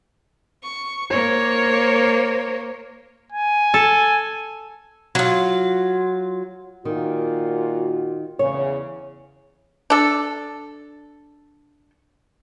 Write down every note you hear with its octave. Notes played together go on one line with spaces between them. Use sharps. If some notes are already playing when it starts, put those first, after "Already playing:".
C#6
A#3 C5 C#5
G#5
A4
F#3 F4
A#2 D#3 F4 F#4
E2 C#3 C#5
D4 A4